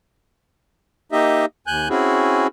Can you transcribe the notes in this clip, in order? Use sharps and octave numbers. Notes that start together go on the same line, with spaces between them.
A#3 D#4 G4 D#5 E5
D#2 G#5 F#6 G6
C4 C#4 E4 F#4 G#4